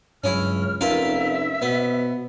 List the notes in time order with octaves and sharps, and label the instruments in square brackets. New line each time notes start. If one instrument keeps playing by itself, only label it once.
[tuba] C#2 [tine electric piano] G2 F#3 [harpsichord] C#4 E4 [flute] F6
[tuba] F1 [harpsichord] A#3 F4 F5 [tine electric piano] C#4 D#4 B4 [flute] E5
[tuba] B2 [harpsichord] B3 [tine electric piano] B4 C5